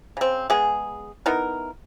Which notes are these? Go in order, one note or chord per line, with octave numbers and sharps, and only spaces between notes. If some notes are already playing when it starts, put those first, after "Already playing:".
C#3 C4
G#3 B3 G#4
B3 D#4 E4 A#4